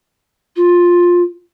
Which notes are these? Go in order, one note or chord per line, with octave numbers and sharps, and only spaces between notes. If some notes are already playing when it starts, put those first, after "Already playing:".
F4